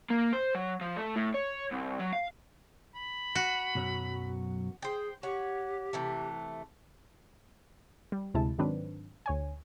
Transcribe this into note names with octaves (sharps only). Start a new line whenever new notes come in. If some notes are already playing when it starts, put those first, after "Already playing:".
A#3
C5
F#3
F3
A3
A2
C#5
C2
F#3
F5
B5
F#4
B1 F#2 F#3
G#4 C5 G5
G4 C#5 F#5
C3 E3 A3
G3
D2 C3 G#3 E4 A5
G#2 D#3 F#3 C4 D4 B4
D2 C#5 G#5